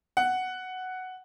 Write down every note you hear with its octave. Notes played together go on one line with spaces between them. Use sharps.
F#5